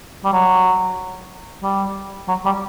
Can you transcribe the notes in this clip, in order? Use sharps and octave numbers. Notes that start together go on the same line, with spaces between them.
G3
F#3
G3
F#3
G3